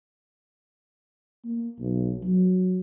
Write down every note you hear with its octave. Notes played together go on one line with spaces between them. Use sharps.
A#3
B1
F#3